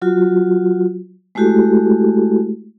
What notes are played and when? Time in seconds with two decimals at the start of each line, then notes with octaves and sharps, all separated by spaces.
0.02 F#3 F4 F#4
1.35 G#3 A3 E4 F#4 G4 A4